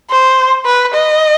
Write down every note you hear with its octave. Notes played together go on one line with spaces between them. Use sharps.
C5
B4
D#5